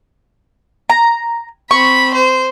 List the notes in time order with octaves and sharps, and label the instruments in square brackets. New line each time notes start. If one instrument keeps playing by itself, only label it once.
[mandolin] A#5
[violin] C4 B5 [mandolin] C#6
[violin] C5